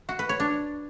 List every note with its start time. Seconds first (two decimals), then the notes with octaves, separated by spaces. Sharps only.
0.09 F#4
0.19 B4
0.29 C#5
0.40 D4